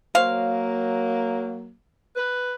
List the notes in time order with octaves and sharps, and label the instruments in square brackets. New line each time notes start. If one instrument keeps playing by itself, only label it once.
[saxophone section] F#3 A#3 [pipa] C5 C#5 F5
[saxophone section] B4